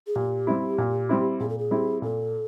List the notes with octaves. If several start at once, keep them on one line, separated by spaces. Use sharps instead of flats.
G#4
A#2 G4
G3 C4 E4
A#2
G3 C4 E4
A#2 G#4
A4
G#4
G3 C4 E4
A#2 A4